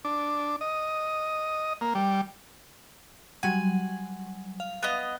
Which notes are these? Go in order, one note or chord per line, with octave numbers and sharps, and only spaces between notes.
D4
D#5
A#3
G3
F#3 G3 F#5 G#5
F5
B3 D#5